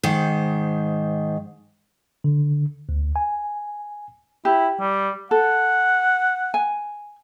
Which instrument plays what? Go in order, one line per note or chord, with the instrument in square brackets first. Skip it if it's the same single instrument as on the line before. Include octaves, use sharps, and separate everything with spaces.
[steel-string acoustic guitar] G#2 D#3 C5
[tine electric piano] D3
D2
G#5
[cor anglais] E4 [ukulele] G4
[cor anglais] G3
[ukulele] A4 [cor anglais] F#5
[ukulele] G#5